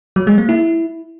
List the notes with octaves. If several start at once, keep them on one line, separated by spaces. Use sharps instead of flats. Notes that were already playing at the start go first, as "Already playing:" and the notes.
F#3
G#3
A#3
E4